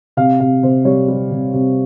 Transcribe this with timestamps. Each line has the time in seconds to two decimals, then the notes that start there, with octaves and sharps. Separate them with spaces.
0.17 C3 F5
0.40 C3 F5
0.63 C3 C5
0.85 G3 C#5
1.08 G3
1.31 C3
1.53 C3